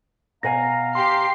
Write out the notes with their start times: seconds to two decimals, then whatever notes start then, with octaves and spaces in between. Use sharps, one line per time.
0.43 B2 F5 F#5 G#5 A#5 A#6
0.95 G4 C6 C7